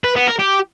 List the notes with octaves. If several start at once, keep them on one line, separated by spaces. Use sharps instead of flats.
B4
B3
A#4
G4